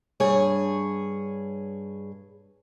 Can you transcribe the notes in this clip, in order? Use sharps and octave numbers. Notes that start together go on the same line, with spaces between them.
G2 G#4 C#5